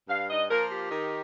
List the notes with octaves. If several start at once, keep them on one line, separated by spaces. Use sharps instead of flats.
G2 F5
D#5
F3 A#3 F4 A#4
G4
D#3